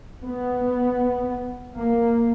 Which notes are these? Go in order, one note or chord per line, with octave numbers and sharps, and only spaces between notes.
B3
A#3